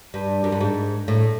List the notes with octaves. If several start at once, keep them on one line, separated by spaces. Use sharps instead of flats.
G2
F#2
G2
G#2
A2